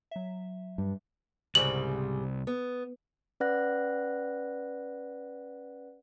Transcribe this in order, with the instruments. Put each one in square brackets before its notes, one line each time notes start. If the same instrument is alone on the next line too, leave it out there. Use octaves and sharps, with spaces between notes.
[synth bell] F#3 E5
[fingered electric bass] G2
[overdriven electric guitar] C2 [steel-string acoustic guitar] G#2 C#3 G3 [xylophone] F#7
[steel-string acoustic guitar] B3
[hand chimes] C#4 B4 D5 F#5 F#6 A#6